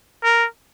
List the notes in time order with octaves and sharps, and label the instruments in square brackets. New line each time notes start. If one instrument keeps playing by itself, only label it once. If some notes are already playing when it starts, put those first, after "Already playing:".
[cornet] A#4